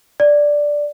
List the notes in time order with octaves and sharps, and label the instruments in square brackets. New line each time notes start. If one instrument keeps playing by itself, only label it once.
[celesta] D5